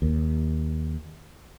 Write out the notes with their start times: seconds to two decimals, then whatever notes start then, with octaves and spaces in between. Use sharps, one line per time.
0.02 D#2